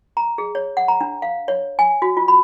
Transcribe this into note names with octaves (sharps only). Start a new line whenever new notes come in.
A#5
G#4
C#5
F#5
A#5
D4
F5
C#5
G#5
F#4
F4
B5